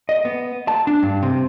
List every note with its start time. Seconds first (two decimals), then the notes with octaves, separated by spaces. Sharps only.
0.09 D#5
0.25 B3
0.68 A5
0.87 D4
1.03 G2
1.22 C3